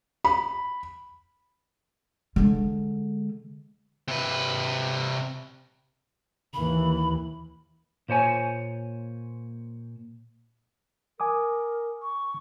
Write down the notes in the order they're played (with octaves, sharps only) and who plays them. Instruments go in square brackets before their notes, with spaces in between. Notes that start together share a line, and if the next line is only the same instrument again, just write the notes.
[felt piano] B5
[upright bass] D3 G#3
[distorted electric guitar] C3 B4
[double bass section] D#2 E3 [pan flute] B5
[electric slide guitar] A#2 C5 C#5 G#5
[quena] A#4 [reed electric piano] G#5 D6 D#6
[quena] C#6